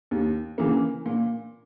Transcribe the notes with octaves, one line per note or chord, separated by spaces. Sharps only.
D#2
C#3 E3 A#3
A#2